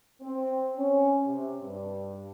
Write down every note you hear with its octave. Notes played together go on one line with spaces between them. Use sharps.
C4
C#4
C3
G2